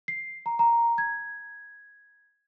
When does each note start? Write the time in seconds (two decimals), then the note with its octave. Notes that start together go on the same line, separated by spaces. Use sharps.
0.08 C7
0.46 A#5
0.59 A#5
0.98 G#6